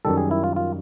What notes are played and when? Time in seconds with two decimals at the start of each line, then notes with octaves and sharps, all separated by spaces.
0.05 F#2 D#3 G3 A4
0.17 G#4
0.31 E4
0.44 F4
0.56 F4